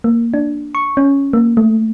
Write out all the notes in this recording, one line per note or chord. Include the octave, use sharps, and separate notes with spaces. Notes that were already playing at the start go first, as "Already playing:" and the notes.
A#3
D4
C#6
C#4
A#3
A3